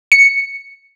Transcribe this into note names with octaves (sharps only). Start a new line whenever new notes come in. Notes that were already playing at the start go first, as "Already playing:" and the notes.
C#7